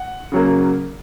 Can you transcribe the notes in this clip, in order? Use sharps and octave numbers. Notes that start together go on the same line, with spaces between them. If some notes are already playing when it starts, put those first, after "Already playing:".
Already playing: F#5
C#3 F#3 A#3